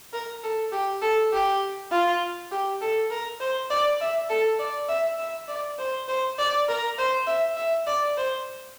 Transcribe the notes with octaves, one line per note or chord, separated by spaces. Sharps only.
A#4
A4
G4
A4
G4
F4
G4
A4
A#4
C5
D5
E5
A4
D5
E5
E5
D5
C5
C5
D5
A#4
C5
E5
E5
D5
C5